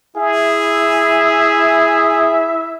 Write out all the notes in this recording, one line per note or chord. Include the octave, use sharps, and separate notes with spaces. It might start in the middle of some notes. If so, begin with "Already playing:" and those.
E4 G#4 E5